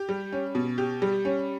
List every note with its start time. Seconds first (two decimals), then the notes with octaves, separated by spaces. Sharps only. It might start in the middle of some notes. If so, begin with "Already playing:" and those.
Already playing: G4
0.09 G3
0.32 C#4
0.55 B2
0.78 G4
1.02 G3
1.25 C#4